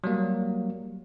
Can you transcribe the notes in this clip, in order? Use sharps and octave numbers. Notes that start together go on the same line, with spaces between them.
F#3 G3 A#3